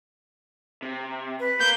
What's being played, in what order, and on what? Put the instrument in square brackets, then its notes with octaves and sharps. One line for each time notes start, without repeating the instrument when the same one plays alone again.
[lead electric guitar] C3
[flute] B4
[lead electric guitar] A#3 [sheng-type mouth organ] G6